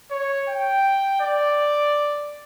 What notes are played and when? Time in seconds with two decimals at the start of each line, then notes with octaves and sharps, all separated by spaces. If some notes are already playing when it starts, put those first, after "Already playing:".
0.11 C#5
0.49 G5
1.21 D5